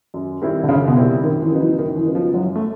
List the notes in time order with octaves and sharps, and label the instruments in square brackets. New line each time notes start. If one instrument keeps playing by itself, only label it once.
[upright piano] F#2
D#3 G3 C4 E4
[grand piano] D3
[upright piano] F#2 [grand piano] C#3
[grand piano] B2
[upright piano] D#3 G3 C4 E4
[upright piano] F#2 [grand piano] D#3
[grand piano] E3
[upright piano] C#3 F#3 B3 D#4
[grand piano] E3
[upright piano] F#2 [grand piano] D#3
[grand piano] E3
[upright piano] C#3 F#3 B3 D#4
[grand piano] F3
[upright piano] F#2 [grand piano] F#3
[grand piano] A3